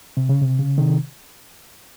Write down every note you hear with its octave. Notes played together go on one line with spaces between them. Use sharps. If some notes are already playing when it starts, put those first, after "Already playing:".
C3
C#3
C3
C#3
C3 D#3